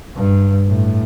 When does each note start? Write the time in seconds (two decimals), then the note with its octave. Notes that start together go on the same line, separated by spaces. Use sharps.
0.16 G2
0.67 A2